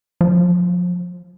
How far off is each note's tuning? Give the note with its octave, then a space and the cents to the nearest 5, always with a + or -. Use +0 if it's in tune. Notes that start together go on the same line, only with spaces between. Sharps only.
F3 +30